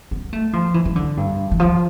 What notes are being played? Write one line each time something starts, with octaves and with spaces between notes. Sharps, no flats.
B3
A3
F3
E3
E3
D3
G2
E3
F3